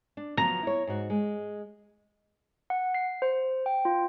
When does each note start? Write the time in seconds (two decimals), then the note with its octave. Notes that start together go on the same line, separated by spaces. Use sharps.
0.17 D4
0.37 F3 F#3 B3 A#5
0.63 E4 C#5
0.87 G#2 F#4
1.10 G#3
2.70 F#5
2.94 C7
3.22 C5
3.66 G5
3.85 F4